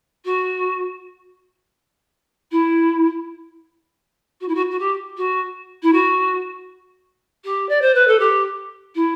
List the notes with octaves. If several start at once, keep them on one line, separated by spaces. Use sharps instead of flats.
F#4
E4
F#4
E4
F#4
F#4
G4
F#4
E4
F#4
G4
D5
C5
B4
A4
G4
E4